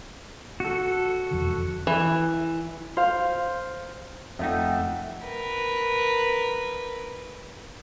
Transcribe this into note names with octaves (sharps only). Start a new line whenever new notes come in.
F#4 A4
E1 F2 D3
E3
C5 F5
F2 A3 D#4 E5 F#5 G5
A#4 B4